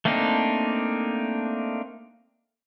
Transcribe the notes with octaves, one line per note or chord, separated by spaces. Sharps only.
A3 A#3 C4 D4 D#4